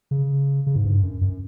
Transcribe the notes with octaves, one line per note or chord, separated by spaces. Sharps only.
C#3
C#3
G#2
G2
F#2
F#2